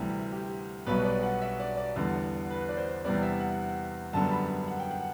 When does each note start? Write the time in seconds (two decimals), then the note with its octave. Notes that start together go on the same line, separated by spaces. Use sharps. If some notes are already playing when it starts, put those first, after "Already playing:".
Already playing: D2 C3 E3 G3
0.32 G4
0.86 B1 B2 G3 B3 B4
1.04 D5
1.23 F#5
1.42 E5
1.60 D5
1.77 D5
1.96 E2 D3 G3 B3
2.51 B4
2.69 D5
2.77 C5
3.05 E2 C3 G3 B3 D5
3.23 E5
3.40 F#5
4.13 F#2 D3 G3 B3 A5
4.31 B5
4.68 F#5
4.80 G5
4.91 F#5